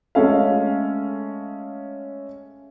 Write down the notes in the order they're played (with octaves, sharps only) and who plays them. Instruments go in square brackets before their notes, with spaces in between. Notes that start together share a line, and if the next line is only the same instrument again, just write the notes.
[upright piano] G#3 A3 C#4 A4 F5